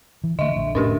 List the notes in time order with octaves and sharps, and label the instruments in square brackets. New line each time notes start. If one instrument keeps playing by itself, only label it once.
[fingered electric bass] E3
[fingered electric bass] D3 A3 [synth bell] D#5 E5
[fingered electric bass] A#1 D3
[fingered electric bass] F1 A2 D3 [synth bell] C#4 D4 G4